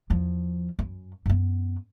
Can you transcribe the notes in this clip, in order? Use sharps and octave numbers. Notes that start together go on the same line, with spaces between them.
E2 F3
F#2
F#2 B3